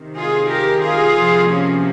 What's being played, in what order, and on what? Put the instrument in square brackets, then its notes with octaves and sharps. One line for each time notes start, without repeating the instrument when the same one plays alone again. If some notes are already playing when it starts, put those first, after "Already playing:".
Already playing: [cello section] C3 D#3
F4 G#4
G4 A#4
F4 G#4
C3 F3
A#3 C#4